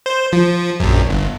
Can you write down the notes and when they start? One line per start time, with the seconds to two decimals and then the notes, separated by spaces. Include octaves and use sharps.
0.06 C5
0.33 F3
0.80 A#1 F#2
1.10 G1